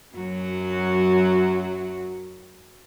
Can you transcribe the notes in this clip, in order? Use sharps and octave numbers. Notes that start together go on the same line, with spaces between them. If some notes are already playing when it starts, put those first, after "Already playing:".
F#2 F#3 F#4